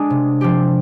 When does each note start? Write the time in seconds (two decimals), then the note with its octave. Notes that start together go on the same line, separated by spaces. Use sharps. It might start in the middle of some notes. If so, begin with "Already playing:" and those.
Already playing: G#3 D4 G#4
0.10 C3
0.41 F3 C4 G4